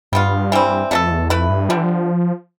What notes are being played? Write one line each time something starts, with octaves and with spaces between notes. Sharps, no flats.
G2 G3 B3 F4
E3 G3 C4
F2 B2 A3 D4 A4
E2
F2 A3 E4 B4
G2
D3 F3 G3 D4
E3
F3